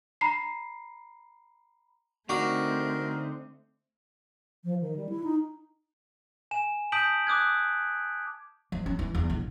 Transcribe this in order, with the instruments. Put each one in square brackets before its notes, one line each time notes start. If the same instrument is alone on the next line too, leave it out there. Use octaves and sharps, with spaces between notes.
[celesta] A#5 B5 C7
[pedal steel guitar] D3 D4 D#4 [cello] A3 C4 [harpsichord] F#4 [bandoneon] A#4
[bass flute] F3
D#3
G3
E4
D#4
[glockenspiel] G#5 E7
A5 D#6 G6 B6 D7 F#7
D6 D#6 F#6 G#6
[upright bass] F3
C#4
E3
E2
A#1